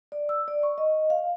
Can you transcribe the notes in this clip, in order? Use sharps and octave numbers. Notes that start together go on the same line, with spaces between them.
D5
E6
D5
C#6
D#5
F5